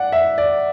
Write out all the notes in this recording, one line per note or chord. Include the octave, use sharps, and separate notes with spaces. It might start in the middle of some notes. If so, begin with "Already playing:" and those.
Already playing: D5 F#5
E5
D5